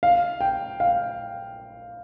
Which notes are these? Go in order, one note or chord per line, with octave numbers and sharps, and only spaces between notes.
F5
G5
F5